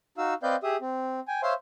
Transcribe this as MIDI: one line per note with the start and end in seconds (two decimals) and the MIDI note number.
0.18 0.34 63
0.18 0.34 66
0.18 0.34 77
0.18 0.34 88
0.43 0.56 60
0.43 0.56 71
0.43 0.56 74
0.43 0.56 75
0.43 0.56 77
0.43 0.56 91
0.63 0.76 67
0.63 0.76 68
0.63 0.76 76
0.63 0.76 87
0.81 1.20 60
1.28 1.41 79
1.28 1.41 80
1.43 1.54 72
1.43 1.54 73
1.43 1.54 76
1.43 1.54 77
1.43 1.54 84